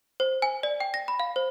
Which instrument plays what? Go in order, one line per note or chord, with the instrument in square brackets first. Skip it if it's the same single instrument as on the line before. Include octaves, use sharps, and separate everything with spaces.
[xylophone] C5
G#5
D5
G5
A#6
B5
F5
C5